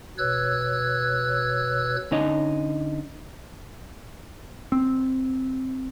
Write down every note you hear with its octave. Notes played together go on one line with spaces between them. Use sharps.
B2 B4 C#5 E6 F#6 G#6
D3 C#4 D#4 C#5 D#5
C4